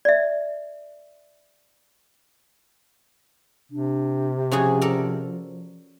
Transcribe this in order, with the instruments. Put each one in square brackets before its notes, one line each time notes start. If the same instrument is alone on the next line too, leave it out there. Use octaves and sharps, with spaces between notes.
[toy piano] D5 E5
[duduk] C3 [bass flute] D4
[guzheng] C#3 F#4 G#4 [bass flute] F3
[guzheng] A4 A#4 D5